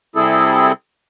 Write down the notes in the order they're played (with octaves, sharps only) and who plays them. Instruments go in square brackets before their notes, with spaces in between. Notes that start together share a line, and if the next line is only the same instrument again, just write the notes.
[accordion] C3 G3 C4 E4 G#4 A4